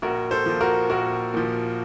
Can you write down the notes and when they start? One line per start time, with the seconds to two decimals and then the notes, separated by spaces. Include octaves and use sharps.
0.02 A#1 F#4 A#4
0.31 A4 C5
0.46 A#2 F3
0.61 F#4 A#4
0.90 A#1 F#4 A#4
1.34 A#2 F3